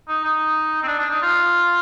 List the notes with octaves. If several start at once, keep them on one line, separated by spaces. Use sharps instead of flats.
D#4
D#4
C4
D4
D4
D#4
F4